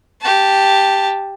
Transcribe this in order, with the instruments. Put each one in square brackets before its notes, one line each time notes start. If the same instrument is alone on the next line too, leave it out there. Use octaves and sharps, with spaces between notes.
[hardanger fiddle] G4 A5